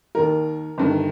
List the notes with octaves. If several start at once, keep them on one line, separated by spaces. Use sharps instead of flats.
D#2 D#3 A#4
G1 G2 D#3